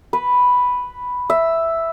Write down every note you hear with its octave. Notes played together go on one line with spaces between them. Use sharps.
B4
E5